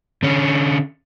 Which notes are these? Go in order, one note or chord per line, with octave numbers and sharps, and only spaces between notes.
D3 C#4